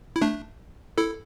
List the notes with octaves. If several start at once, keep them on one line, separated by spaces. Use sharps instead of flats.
E4
A3 D4
E4 A4